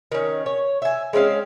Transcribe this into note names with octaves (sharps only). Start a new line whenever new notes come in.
D#3 C#4
C#5
E5 G#5
G#3 C4 C#4 F5